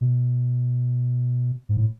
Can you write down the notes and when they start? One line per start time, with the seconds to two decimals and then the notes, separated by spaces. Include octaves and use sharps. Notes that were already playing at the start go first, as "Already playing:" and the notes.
0.01 B2
1.69 G#2
1.77 A2